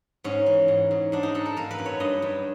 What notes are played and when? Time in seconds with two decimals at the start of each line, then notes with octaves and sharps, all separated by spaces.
0.24 G#2 C#4
0.46 E3
0.68 G#2
0.91 G#2
1.12 G#2 D4
1.23 D#4
1.35 G#3 A4
1.46 A4
1.57 A#3 A#4
1.71 B4
1.79 F#2
1.86 C#5
2.00 G2 D#5
2.22 G2